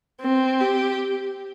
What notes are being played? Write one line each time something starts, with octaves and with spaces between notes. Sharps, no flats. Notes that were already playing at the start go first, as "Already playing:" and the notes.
C4
G4